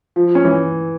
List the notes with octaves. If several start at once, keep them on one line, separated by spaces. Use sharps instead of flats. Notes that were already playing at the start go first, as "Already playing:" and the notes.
F3
C#4
E3